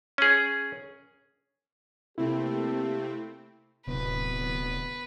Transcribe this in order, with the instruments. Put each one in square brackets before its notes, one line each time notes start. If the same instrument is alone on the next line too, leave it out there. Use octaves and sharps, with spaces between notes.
[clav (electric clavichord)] C#4 G#4
[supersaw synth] C3 A3 C4 [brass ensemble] A#3 G4 A4 [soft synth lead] E4
[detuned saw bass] D1 [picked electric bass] C3 C4 [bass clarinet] B3 [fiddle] B4